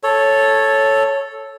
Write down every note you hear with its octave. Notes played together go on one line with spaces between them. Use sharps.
A4 C#5